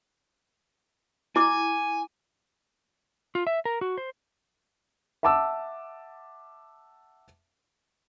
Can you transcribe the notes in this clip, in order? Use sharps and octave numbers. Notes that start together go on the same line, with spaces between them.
E4 G#5 D6
F4
E5
A#4
F#4
C5
E5 F#5 A5 D6 E6